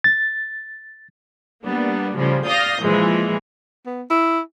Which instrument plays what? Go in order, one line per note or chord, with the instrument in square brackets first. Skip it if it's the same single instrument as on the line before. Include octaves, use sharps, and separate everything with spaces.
[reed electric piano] A6
[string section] G3 A#3 B3 D4
A2 C#3 F3 G3
D5 F5 D#6 G6 A#6 C7
A#2 E3 F3 G#3
[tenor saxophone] B3
E4